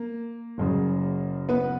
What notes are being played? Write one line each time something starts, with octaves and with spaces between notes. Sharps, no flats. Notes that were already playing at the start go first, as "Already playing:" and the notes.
Already playing: A#3
F#1 F#2 C#3
B3 B4